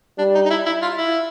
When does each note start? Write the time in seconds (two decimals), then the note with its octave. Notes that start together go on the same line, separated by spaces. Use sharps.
0.18 G3 D4
0.35 D#4
0.45 D#4
0.50 E4
0.66 E4
0.82 F4
0.98 E4